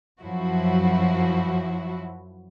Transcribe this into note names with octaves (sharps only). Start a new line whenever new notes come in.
F#2 F3 F#3 E4 F#4